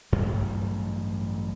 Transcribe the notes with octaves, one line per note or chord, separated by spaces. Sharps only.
A1 G2 F#3 G3